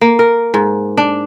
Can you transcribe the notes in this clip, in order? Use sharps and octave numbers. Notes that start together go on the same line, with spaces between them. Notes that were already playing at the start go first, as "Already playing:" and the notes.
A#3
A#4
G#2
D4